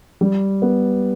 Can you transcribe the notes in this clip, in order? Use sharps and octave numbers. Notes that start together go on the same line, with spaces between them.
G3
B3